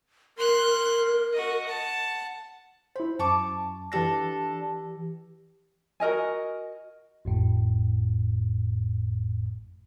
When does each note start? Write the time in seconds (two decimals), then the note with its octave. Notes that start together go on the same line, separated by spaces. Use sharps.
0.38 A#4 C6 F#6
1.33 F#4 D#5
1.65 F#5 A5
2.96 E4 C5 B5
3.19 F#2 A5 C#6 D6
3.92 E3 D4 G4 A4 A#6
6.00 F#4 A#4 D#5 G#5
7.25 G#1 F2 A2